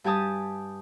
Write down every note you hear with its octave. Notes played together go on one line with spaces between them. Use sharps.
G2 G4 G#5 A5 D#6